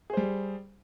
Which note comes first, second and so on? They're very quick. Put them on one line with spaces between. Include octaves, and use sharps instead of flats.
G#4 C5 G3